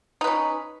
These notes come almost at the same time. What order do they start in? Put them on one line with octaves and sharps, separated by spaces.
D#4 B4 C#4